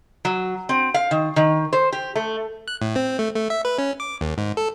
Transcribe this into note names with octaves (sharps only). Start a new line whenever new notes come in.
F#3
C4
F5
D#3
D#3
C5
G4
A3
F#6
A2
C4
A3
A3
E5
B4
C#4
D6
D#2
G#2
A4